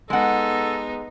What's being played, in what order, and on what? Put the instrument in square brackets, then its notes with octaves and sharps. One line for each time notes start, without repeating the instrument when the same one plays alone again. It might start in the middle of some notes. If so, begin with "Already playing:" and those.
[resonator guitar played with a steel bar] G#3 F#5 [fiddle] B3 D#4 [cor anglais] A4